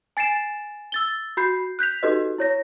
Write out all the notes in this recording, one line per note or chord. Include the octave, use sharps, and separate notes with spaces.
G#5 A6 C7 D7 E7
E6 A6 G7
F#4 B5 G6 C7
F#6 G6 B6 F7
D#4 F#4 G4 A4 B4 D#5
E4 C#5 A#6